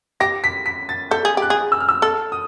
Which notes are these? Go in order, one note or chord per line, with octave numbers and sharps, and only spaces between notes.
G4 A#6
B6
B6
A6
A4 G6
G#4
G4 F#6
G#4
E6
F6
E6
A4 E6
D#6